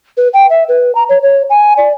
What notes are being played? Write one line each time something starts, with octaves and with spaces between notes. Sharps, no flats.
B4
G5
E5
B4
A#5
C#5
C#5
G#5
D5